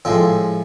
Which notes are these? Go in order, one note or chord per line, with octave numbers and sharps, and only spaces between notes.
A2 F3 G#3 C4